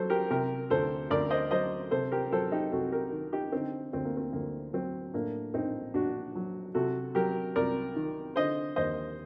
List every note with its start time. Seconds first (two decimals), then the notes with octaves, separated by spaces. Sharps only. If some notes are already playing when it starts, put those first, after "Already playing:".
Already playing: F#3 A4 C5
0.10 G4 A#4
0.30 C3 G4 A#4
0.70 D2 A4 C5
1.11 D2 A#4 D5
1.30 C5 D#5
1.51 F#3 C5 D#5
1.91 C3 A4 C5
2.12 G4 A#4
2.32 F#3 A4 C5
2.52 D#4 G4
2.72 C2 F#4 A4
2.92 G4 A#4
3.12 D#3
3.33 D#4 G4
3.52 D3 C4 D#4
3.93 D2 C4
4.05 A#3
4.17 C4
4.33 D2 A#3
4.73 F#3 C4
5.14 A2 A#3 D4
5.54 A#1 C4 D#4
5.94 A#1 D4 F#4
6.35 F#3
6.75 C3 F#4 A4
7.15 F#3 G4 A#4
7.56 C2 A#4 D5
7.96 D#3
8.36 D3 C5 D#5
8.76 D#2 C5 D#5